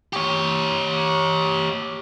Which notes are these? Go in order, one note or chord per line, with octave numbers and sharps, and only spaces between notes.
G4 C#5